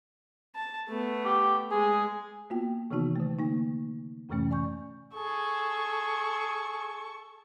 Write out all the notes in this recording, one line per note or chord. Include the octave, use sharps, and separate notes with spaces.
A5
A3 B3
G4
G#3 G#4
A#3 B3 F4 F#4 G5
C3 D#3 E3 B3 D#4 F#4
D3 A3
A#3 D#4
F2 A2 C3 E3 A3 C#4
D5 G#5 C#6 G6
G#4 A4 C#6